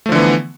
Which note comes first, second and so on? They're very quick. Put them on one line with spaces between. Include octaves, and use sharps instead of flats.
A3 F3 D3 E3 B3